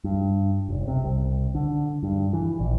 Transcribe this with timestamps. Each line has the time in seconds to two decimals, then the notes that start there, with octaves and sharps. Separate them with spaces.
0.04 G2
0.68 F1
0.88 C3
1.04 C2
1.55 D3
2.03 G2
2.33 E3
2.60 A#1